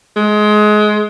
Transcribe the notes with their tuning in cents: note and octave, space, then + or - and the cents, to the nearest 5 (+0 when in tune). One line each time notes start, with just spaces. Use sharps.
G#3 +25